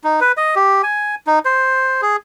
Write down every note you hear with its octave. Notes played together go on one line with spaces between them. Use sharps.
D#4
B4
D#5
G4
G#5
D#4
C5
G#4